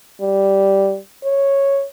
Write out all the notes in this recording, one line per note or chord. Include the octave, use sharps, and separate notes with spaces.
G3
C#5